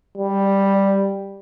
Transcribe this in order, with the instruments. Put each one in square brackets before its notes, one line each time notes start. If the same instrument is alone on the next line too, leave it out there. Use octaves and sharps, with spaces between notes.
[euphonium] G3